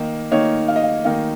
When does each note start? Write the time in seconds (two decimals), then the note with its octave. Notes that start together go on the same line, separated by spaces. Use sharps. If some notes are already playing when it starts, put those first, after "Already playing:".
Already playing: D#3 A#3 D#4
0.31 D#3 A#3 D#4 C#5
0.68 F5
0.76 D#5
0.83 F5
1.05 D#3 A#3 D#4 F5